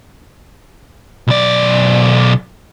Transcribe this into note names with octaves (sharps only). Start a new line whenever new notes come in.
B1 D5